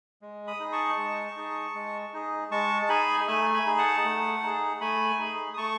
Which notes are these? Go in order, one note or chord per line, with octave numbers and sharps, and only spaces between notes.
G#3
B5 D#6
D#4 G#4
A5 C#6
G#3
D#4 G#4
G#3
D#4 G#4
G#3 A5 C#6
A5
D#4 G#4 G#5 B5
A3 E5 G#5
G#5 B5
D#4 G#4
F#5 A5
A3
D#4 G#4
A3 G#5 B5
D#4 G#4
D#6
A3 A5 C#6